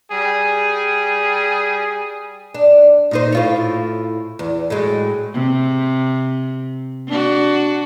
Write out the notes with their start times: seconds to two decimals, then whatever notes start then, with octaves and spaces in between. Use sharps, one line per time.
0.11 G3 G#4
2.54 D4
3.11 A#2 D#4 C5
3.32 A2 F4 C#5
4.39 E2
4.70 A2 F#3 G#3
5.34 C3
7.08 D4 F#4